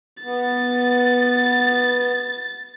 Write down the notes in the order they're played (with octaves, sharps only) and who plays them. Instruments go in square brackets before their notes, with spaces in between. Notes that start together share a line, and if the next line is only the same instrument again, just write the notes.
[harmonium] B3 [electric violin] A6